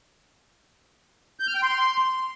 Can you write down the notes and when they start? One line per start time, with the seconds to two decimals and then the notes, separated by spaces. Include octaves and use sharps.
1.40 G6
1.47 F6
1.55 G5
1.63 C6